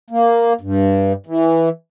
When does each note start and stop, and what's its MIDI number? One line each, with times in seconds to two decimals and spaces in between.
0.10 0.53 58
0.61 1.13 43
1.27 1.69 52